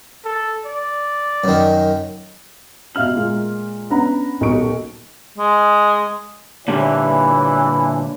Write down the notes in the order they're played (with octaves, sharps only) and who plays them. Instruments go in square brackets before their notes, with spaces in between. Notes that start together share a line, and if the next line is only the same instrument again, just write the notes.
[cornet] A4
D5
[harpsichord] F#2 D#3
[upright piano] B2 E5 F5 F6 F#7
A#2 G#3 A#3
B3 C#4 D4 F#5 A#5 B5
D#1 B1 F#4 A#4 C#6 D7
[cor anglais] G#3
[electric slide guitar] A#2 D3 G3 [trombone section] E3 [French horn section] C#5